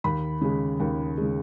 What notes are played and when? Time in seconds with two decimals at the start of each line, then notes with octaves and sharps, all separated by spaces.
0.04 D#2 B5
0.41 C#3 G#3
0.80 D#2
1.18 C#3 G#3